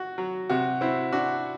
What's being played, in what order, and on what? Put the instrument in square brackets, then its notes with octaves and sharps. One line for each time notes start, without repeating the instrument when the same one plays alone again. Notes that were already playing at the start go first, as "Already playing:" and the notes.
Already playing: [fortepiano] F#4
F#3
[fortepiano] C3 [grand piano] F#4
[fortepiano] C4 [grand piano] E4
[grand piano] D4 [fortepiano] F#4